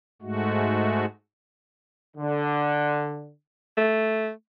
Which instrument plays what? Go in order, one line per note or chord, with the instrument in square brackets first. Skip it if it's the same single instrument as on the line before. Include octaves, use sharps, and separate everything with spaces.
[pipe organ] G#2 G#3 A3 F#4
[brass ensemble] D3
[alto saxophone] A3